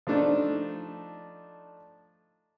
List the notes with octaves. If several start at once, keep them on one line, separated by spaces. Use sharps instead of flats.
F3 A3 D4 D#4